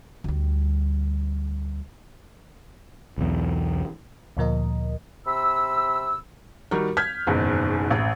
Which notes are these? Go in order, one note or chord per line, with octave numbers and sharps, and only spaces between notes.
D2 G3
B1 E2
D2 A#2 F3 A#4 D#5
C3 B5 E6
D#3 G3 D#4 F#4 A#4
F6 G6 G#6 B6
F#1 E2 G#2 B2 D#3
A1